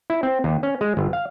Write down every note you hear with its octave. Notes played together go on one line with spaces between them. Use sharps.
E4
C4
D#2
C#4
G#3
G1
F5